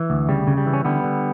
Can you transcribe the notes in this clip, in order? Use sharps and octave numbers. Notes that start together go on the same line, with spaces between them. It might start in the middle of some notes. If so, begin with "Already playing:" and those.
Already playing: E3
D2
C#3 G3
C#3
G3
E3
C#4
D3 G3 B3
D3